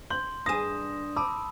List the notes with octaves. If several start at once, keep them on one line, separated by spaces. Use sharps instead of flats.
C6 G6 F#7
G2 G#4 D#6 A#6 E7
A5 B5 D6 E6